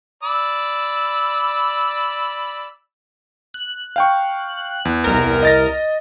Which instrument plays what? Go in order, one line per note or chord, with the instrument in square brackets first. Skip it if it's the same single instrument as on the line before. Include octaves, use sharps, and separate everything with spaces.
[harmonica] D5 B5 E6
[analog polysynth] F#6
[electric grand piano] F5 G5 C#6
E2
[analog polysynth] C2 A#4
[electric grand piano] D#5 A6 A#6